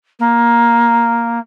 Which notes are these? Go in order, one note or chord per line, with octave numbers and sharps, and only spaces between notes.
A#3